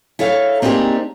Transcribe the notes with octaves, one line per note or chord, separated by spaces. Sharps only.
E4 A4 C#5 F5
A#3 C4 D4 D#4 G4 G#4